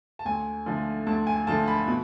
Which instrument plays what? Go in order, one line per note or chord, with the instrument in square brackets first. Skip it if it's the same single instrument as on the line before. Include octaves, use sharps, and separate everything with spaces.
[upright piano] A5
D2 G#5
D3 F3 A3
D2 A5
G#5
D3 F3 A3 A5
B5
B2